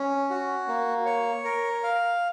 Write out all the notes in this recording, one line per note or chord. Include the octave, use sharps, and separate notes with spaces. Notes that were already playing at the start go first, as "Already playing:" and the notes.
Already playing: C#4
F#4
A#3
C#5
A#4
F5